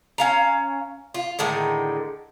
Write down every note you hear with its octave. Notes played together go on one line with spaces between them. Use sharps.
C#4 F5 A#5
F4
A2 D3 D#3 G#3